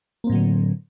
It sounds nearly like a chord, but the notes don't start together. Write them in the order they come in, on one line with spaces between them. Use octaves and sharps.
A#3 C4 A2 F#3 D3